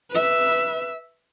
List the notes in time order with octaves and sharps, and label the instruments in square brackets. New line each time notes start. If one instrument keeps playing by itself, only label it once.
[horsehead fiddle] B4 E5